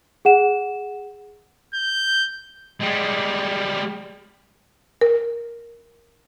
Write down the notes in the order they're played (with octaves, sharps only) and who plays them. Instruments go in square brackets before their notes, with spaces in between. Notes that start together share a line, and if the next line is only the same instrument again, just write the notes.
[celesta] G#4 F#5 E7
[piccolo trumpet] G6
[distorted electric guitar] G3 G#3
[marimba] A#4